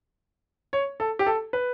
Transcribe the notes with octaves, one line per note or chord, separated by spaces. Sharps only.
C#5
A4
G4
A4
B4